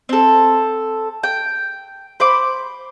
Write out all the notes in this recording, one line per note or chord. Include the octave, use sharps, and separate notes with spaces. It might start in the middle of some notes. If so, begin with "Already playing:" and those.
C4 A4
G5
C5 B5 D6